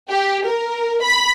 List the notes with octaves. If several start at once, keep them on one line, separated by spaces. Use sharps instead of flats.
G4
A#4
B5